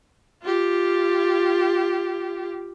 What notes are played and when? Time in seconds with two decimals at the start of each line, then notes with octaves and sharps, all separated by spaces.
0.42 F4 G4